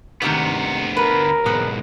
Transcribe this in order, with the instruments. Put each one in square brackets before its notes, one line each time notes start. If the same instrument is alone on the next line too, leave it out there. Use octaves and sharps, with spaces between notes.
[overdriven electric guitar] D2 B3 [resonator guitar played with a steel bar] G#2 C3 D#3
[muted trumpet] A#4 [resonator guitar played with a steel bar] B4
[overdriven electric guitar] B1 G#2 [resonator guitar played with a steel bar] B3